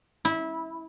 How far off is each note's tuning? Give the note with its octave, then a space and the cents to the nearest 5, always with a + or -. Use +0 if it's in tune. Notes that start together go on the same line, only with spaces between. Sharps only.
E4 -20